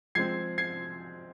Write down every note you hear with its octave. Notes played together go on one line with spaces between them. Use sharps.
F3 G#3 C4 G#6 C7
G#6 C7